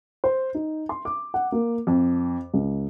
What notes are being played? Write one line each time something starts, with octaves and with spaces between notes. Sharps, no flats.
C5
D#4
C6
D6
F#5
A#3
F2
C#2